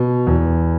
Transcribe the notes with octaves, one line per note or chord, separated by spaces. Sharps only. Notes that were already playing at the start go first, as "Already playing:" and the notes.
Already playing: B2
E2